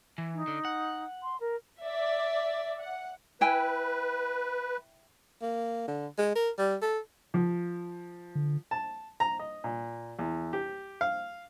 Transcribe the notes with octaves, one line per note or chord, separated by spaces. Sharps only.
E3
D#4
D3
F#5
C6
A#4
D5 E5
F#5
E4 B4 G5 G#5
A#3
D3
G#3
A#4
G3
A4
F3
D3
A5
A#5
D#5
A#2
E2
G4
F5